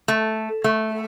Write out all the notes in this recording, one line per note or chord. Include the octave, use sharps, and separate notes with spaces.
A3
A3